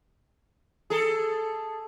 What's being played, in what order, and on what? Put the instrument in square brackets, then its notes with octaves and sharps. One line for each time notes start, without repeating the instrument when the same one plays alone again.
[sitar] G#4 A4